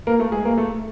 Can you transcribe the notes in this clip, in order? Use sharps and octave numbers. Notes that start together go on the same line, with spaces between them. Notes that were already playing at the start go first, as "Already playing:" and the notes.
A#3 A#4
A3 A4
G#3 G#4
A#3 A#4
A3 A4